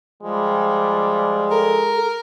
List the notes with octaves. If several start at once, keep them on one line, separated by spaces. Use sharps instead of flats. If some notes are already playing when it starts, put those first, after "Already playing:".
F3 G3 G#3
A4 A#4